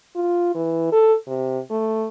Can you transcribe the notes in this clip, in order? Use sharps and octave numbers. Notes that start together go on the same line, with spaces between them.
F4
E3
A4
C3
A3